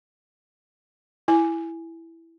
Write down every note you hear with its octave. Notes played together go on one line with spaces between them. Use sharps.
E4 G#5